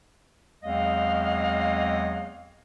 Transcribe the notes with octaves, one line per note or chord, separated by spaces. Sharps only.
E2 F#3 G#3 C4 D#5 F5